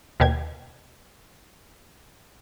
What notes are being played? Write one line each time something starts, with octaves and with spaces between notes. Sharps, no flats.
D#2 B2 G4 G#6